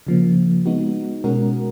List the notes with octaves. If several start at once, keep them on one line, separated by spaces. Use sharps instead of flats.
C#3 F3 A#3
G#3 B3 D#4 F#4
B2 G#3 C#4 F#4 A#4